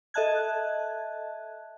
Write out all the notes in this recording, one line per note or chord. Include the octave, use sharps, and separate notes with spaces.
A4 D#5 E5 A5 F#6 G#6